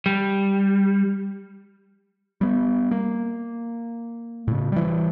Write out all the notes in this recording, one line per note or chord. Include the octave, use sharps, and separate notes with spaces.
G3
G3 B3
A#3
A2 C#3
E3 G3